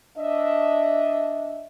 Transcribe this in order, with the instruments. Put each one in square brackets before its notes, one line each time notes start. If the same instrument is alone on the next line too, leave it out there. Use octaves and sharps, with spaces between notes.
[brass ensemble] D4 D#5 E5